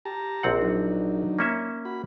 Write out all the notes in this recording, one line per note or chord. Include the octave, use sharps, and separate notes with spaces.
G4 A5 A#5
A#1 C4 F#5
F#3 D4 D#4
A#3 C#4 E5
F#4 B5